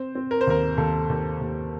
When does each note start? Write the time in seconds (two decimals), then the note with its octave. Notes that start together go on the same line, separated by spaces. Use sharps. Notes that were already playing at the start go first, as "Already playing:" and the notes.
Already playing: C4 C5
0.15 C4
0.31 A#4
0.41 C5
0.47 D#2 A#4
0.78 D#2 A4
1.09 D#2
1.41 D#2